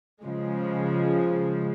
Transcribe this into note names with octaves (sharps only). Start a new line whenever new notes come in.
C#3 F3 G#3